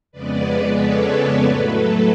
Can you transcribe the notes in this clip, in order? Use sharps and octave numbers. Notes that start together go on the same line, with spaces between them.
F2 C#3 G#3 B3 B4 D5
A4 C#5
A2 F#3 A3 B4
A4